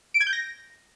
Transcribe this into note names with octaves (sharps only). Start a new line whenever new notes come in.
D7
G#6
G6
A#6